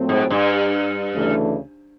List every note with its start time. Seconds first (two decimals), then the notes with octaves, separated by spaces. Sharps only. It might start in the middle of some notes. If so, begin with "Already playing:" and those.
Already playing: A#2 F#3 A3 C4
0.09 G#2
0.31 G2
1.14 D2 C#3 E3 A3 D4